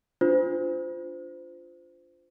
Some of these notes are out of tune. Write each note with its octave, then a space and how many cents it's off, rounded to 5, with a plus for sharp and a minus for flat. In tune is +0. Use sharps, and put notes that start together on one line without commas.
D4 +0 F4 +0 C5 -25